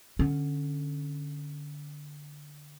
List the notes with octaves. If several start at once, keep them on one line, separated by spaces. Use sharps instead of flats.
D3 C#4